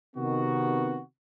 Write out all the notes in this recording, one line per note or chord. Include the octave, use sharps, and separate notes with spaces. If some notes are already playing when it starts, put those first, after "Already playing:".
C3 D#3 B3 F#4